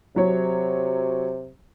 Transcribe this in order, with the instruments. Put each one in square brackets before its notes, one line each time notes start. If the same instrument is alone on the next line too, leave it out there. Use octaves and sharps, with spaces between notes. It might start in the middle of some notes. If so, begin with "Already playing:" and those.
[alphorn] C3 [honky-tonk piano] F#3 C#5